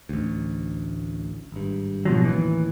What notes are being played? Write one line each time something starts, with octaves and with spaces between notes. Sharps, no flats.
A1 D2
G#1 G2
B2 F3 F#3
A1 D#2 E3